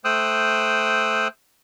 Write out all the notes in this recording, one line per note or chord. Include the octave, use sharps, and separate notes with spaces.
A3 C5 G5 D#6 E6 F#6